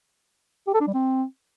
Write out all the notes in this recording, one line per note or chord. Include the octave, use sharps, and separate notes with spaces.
G4
A4
D4
G3
C4